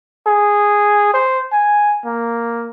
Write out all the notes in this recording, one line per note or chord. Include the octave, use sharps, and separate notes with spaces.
G#4
C5
G#5
A#3